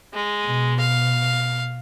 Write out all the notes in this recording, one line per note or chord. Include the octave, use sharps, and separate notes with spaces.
G#3
B2
F5